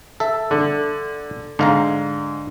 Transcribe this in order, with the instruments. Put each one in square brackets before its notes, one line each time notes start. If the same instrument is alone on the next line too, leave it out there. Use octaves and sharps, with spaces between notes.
[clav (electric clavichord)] A4 E5
[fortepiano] D3
[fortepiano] G#2 [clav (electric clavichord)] D3 F5 A#5